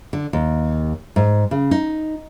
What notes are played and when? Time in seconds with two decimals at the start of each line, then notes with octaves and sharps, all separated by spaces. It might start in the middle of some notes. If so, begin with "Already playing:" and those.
0.13 D3
0.33 D#2
1.16 G#2
1.51 C#3
1.71 D#4